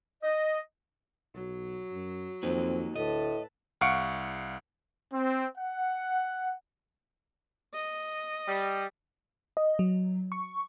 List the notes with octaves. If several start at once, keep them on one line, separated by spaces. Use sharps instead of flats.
D#5
B1 F#3
F#2
F2 A#3 C4 D#4
D2 A2 A4 B4 D#5 A5
C2 F5 F#5 C#6 C#7 D7
C4
F#5
D#5
G3
D#5
F#3
C#6